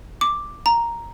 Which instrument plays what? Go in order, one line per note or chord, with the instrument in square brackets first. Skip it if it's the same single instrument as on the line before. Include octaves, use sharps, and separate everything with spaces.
[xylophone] D6
A#5